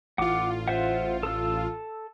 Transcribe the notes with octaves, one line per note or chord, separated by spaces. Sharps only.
A1 F4 F#5 D6
C5 E5 F#5
A4 E6